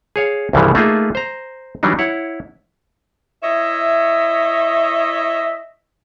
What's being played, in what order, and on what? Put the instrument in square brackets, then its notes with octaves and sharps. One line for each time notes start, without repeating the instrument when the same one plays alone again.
[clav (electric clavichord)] G#4 C#5 F5
C2 G2 C#3 E3 F3 G3
A3 A#3 D#4 F4 G#4 E5
C5 A#5
E3 F#3 G3 D4 D#4
E4 C#5 F#5
[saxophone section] E4 C#5 D#5 E5